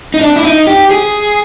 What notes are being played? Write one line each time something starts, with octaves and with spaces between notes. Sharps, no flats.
D#4
D4
E4
D#4
G4
G#4